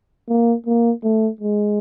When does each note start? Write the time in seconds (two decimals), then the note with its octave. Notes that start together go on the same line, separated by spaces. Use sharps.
0.29 A#3
0.66 A#3
1.03 A3
1.41 G#3